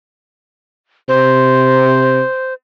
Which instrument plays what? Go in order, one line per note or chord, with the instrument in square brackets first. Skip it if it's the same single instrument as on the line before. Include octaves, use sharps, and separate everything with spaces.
[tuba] C3 [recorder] C5